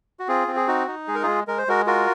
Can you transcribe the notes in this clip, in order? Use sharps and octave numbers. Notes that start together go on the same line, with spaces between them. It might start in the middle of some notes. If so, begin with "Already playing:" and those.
F#4
C4 F4 G#4
C4
G#4
D#4 F#4
D#4
G#3 G#4
A#4
G#3 F4 G#4
G#3 A#4
C5
G#3 F#4 A#4
F4 F#4 A#4